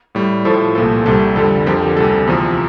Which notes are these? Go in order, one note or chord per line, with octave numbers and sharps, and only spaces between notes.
A2 G3
A2 F3 A4 C5
C2 A#2 F3 A4
C2 C3 G3 A4
F2 D3 G3 A4
F2 D3 F3 G4 A#4
G4
D2 C3 G3 A4
E2 C3 F3